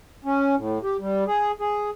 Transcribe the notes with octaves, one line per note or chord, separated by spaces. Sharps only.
C#4
A2
G4
G3
G#4
G#4